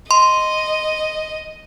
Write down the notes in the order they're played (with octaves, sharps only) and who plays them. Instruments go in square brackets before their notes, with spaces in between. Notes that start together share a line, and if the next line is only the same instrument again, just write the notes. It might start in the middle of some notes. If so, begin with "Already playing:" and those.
[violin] D#5 [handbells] C6